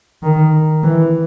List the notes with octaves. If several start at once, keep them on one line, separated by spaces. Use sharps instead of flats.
D#3
E3